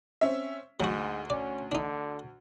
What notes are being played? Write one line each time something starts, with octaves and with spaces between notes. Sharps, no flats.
C4 C#4 E5
D2 G#2 F#3 F#4
C#4 D5
D3 D4 D#4